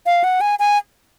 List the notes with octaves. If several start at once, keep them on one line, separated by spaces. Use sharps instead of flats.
F5
F#5
G#5
G#5